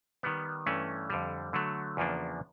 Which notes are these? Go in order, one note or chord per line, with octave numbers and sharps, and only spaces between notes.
D#3 G3 B3
G2 E3 A3 C#4
F2 D3 G3
D3 F#3 A3
E2 C#3 F3 A#3 D4